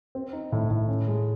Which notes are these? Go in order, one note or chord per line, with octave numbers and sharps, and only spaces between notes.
C4
D#4
A2
A2
C#4
G#3